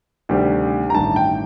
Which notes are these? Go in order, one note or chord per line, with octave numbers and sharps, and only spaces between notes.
D2 C3 D#3 G3
A#5
A1 G2 D#3 A5
G5